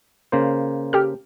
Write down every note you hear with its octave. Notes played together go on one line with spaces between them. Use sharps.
C#3 A#3 C5
G4 A4 F6